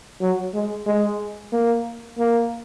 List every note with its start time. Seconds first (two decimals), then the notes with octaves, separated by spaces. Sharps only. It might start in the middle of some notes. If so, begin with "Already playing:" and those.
0.21 F#3
0.54 G#3
0.86 G#3
1.53 A#3
2.19 A#3